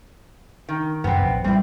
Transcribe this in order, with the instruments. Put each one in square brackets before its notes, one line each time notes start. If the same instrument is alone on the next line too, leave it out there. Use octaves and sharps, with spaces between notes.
[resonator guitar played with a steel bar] D#3
[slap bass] F#2 C3 [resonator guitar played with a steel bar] B3 C4
[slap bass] A#1
[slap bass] G3 [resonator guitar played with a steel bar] C4 E4